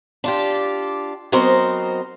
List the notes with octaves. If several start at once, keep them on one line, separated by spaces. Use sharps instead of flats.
D4 F4 G4
F#3 B3 C4 D#4 A#4 C5